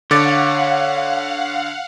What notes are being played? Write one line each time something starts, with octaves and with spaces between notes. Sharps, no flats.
D3 C#5 F5 F#5 D6 A6